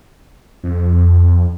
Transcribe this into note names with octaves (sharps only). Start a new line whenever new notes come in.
F2